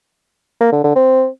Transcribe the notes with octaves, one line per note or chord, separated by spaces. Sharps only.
A#3
D3
D3
C4